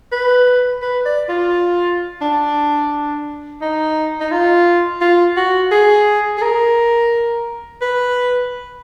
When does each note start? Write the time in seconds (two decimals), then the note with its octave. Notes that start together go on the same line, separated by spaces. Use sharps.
0.12 B4
0.82 B4
1.05 D5
1.29 F4
2.21 D4
3.62 D#4
4.20 D#4
4.31 F4
5.01 F4
5.37 F#4
5.71 G#4
6.38 G#4
6.42 A#4
7.81 B4